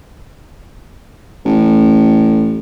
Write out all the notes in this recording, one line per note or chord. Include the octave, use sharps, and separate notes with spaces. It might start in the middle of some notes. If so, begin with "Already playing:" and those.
A1